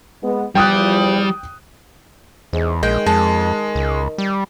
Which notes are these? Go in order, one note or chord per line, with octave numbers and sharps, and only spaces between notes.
G#3 B3
E2 F3 G3 G5 D#6 F#6
E2 G#2
A#1 D#3 G#3 G5
F2 G#3 A5
C#2
G3